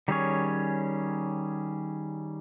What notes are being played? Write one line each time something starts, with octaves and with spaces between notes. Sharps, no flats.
D#3 G3 C#4 G#4 C#5